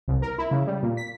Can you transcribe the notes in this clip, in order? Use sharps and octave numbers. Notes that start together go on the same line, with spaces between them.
C2
A#4
E4
C#3
G3
A#2
B6